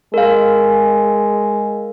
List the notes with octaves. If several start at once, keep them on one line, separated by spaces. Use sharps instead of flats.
G#3 A#4 F5